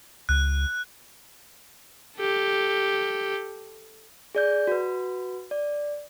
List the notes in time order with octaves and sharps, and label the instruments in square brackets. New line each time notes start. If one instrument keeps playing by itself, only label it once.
[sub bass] C#2 [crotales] F#6
[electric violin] G4 A4
[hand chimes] G#4 D5 G6
F#4 B4
D5